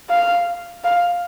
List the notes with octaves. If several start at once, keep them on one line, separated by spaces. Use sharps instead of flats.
F5
F5